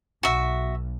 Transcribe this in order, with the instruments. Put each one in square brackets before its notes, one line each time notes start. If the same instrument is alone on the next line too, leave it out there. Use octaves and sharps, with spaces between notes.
[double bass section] B1 [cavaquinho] F#4 E5